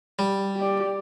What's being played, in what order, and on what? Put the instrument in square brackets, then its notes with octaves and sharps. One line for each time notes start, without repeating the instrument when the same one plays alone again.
[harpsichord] G3
[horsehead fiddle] G4 D5